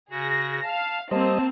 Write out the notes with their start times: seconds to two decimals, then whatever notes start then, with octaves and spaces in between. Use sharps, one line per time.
0.11 C#3 F#4 G#4 A#6
0.63 F5 A5
1.11 G3 A#3 C4 C5 D#5 A5